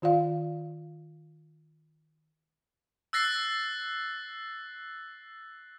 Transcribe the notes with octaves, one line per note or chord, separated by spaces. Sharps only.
D#3 F4 D5 F5
E6 F#6 A6 A#6 C7